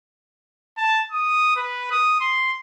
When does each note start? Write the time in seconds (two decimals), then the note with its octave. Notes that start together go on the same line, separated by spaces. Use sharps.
0.77 A5
1.12 D#6
1.56 B4
1.91 D#6
2.20 C6